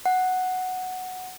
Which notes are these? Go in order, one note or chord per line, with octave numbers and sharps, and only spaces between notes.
F#5